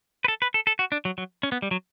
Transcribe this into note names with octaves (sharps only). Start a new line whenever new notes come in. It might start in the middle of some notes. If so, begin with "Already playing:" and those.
B4
A4
B4
A4
A4
F#4
D4
F#3
F#3
C#4
B3
G3
F#3